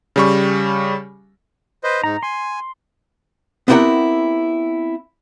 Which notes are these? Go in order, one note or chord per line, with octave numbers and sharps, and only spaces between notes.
C#3 G3 C#6
B4 C5 D#5
G#2 D#4 A#5
G#5 C6
B3 C4 E4 G4 A#4 F#5